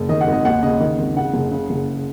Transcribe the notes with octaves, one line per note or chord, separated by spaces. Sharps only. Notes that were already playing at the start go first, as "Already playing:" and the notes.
Already playing: F#1
D#3 D#5
F#5
G#1 D#5
D#2 F#5
C#3 D#5
D#3
G#1
C#3 F#5
F#1
C#3
F#1